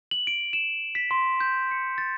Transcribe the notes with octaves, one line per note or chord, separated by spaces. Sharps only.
F#7
D7
E7
B6
C6
G6
C#7
A6